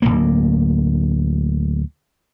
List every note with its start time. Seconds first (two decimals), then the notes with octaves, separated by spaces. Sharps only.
0.02 D1 G1 D2 A#3